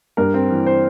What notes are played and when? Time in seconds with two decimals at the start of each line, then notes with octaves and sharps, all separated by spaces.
0.17 G2 A#4
0.34 C4
0.51 E3
0.66 C5